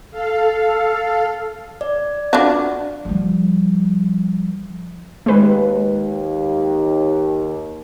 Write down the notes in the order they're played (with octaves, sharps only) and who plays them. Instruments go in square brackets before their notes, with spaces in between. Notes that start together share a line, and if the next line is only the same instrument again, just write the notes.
[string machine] A4 F5
[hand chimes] D5
[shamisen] D4 F4 F#4
[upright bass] F3 G3
[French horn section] D#2 [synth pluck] G#3 B4